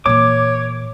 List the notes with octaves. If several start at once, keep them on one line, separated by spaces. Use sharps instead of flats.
A#2 E3 C#5 D6